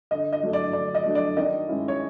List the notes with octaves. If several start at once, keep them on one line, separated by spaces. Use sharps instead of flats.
D3 D#5
D#5
F#3 A3 D4
D5
D3 D5
D#5
F#3 A3 D4
D5
D#3 D#5
G#3 C#4 E4
C#5